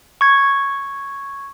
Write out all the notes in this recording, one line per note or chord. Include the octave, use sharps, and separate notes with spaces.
C#6 G#6